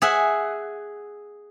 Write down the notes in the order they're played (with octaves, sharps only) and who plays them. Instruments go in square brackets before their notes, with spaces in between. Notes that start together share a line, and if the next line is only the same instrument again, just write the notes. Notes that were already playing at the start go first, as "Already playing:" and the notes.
[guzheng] G#4 E5 F#5